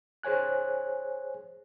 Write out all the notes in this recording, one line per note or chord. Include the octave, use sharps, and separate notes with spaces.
G#4 C5 C#5 G#5 F#6